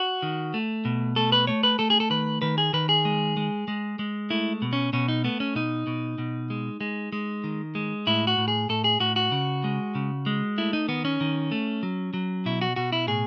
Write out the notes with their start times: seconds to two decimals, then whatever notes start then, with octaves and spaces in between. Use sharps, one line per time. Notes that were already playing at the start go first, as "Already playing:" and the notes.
Already playing: F#4
0.22 D#3
0.54 A3
0.85 B2
1.16 A3 A4
1.32 B4
1.47 A3 C#5
1.63 B4
1.79 A3 A4
1.90 G#4
2.00 A4
2.10 D#3 B4
2.42 D#3 B4
2.58 G#4
2.73 D#3 B4
2.89 G#4
3.05 G#3
3.37 G#3
3.68 G#3
3.99 G#3
4.30 A3 E4
4.62 B2
4.73 C#4
4.93 B2 C#4
5.08 D#4
5.24 A3 B3
5.40 C#4
5.55 B2 D#4
5.87 B2
6.18 B2
6.50 G#3
6.81 G#3
7.12 G#3
7.44 D#3
7.75 G#3
8.07 A2 E4
8.27 F#4
8.38 A2
8.48 G#4
8.69 A2 A4
8.84 G#4
9.00 A2 F#4
9.16 F#4
9.32 C#3
9.64 G#3
9.95 C#3
10.26 G#3
10.58 A3 E4
10.73 D#4
10.88 D#3 B3
11.05 C#4
11.21 D#3
11.52 A3
11.83 F#3
12.14 F#3
12.46 B2 E4
12.61 F#4
12.76 B2 F#4
12.92 E4
13.07 A2 G#4